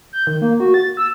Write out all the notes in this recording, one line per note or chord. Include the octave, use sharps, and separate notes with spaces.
G6
D#3
A#3
F#4
A6
E6